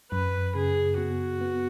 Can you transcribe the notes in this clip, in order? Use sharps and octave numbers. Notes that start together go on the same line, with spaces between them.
F#2 B4
C#3 G#4
B3 F#4
B3